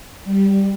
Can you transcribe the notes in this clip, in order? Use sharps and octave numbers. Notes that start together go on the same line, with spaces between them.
G3